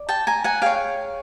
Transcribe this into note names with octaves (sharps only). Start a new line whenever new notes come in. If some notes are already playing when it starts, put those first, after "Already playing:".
Already playing: D5
G5 A5
G#5 A#5
F#5 G#5
G#4 C#5 F5 G5